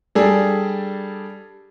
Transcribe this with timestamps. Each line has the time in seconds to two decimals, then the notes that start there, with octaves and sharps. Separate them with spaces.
0.15 G3 D4 G#4 A4